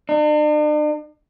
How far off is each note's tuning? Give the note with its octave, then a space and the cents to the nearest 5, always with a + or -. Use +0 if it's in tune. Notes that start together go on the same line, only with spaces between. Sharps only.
D4 +45